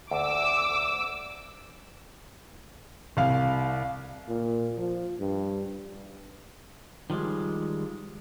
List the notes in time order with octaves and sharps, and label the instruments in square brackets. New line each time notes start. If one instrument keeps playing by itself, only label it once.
[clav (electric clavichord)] D2 [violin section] D6 E6
[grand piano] C2 F5
[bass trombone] A#2
F3
G2
[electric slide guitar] D#3 F3 G3 G#3